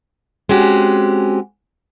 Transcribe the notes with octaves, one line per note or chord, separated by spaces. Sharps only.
G#3 C4 C#4 F#4 G4